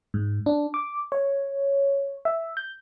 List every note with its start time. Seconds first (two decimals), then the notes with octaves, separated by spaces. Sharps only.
0.14 G#2
0.46 D4
0.74 D6
1.12 C#5
2.25 E5
2.57 G6